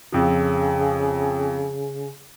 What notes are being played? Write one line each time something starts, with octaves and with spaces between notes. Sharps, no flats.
F2 C#3 F3